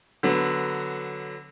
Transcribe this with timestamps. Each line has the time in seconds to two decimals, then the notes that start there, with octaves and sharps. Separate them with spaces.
0.23 D3 F#3 B3